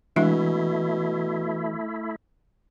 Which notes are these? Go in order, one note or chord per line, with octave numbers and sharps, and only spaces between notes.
B2 E3 G#3 A3 D4 E4 E5